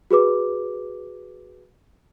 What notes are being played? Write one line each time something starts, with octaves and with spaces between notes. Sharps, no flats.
F#4 G#4 B4 D6